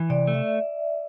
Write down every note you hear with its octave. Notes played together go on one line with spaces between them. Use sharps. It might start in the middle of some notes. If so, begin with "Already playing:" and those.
Already playing: E3
C3 D5
A3
E5